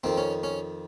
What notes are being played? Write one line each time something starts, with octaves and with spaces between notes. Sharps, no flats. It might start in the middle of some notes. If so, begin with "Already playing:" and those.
F2 D#3 C4
C#4
C#4